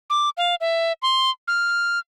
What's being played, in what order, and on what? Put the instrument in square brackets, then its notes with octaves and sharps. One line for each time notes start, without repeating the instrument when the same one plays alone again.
[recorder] D6
F5
E5
C6
F6